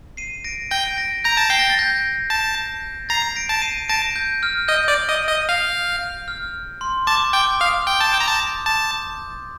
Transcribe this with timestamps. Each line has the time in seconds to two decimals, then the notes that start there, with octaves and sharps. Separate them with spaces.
0.17 C7 D#7
0.44 A#6 D7
0.71 G5 A#6 D7
0.97 A#6 D7
1.24 A#5 G6 A#6
1.37 A5
1.50 G5 C7
1.59 A#6
1.70 A6
1.79 G6 A#6
2.30 A5
3.09 A#5 A6 C7
3.36 A#6 D7
3.49 A5
3.62 C7 D#7
3.88 A5 A#6 D7
4.16 G6
4.43 F6
4.68 D#5 G6
4.88 D5
5.09 D#5
5.28 D#5
5.49 F5
6.28 F6
6.81 C6
7.07 A5 D6
7.33 G5 D6
7.60 F5 D#6
7.87 G5 G6
8.01 A5
8.13 G5
8.20 A#5
8.27 A5
8.66 A5